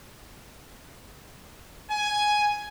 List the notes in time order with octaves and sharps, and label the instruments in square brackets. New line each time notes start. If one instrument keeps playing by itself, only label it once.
[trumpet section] G#5